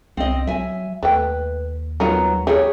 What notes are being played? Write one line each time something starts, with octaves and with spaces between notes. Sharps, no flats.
C2 C4 D#5
F#3 E5 G#5
D#2 A3 B4 G5
F#3 B3 D#4 F4 A#4
E3 G4 G#4 C#5